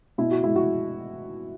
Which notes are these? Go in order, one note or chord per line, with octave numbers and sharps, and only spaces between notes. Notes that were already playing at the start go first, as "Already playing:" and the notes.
B2 E4
F#4
G#3 E4
F#4